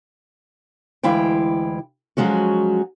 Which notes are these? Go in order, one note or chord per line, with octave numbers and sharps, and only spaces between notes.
D2 E3 G#3 E4 F5 G5
F3 F#3 G#3 C#4 F#4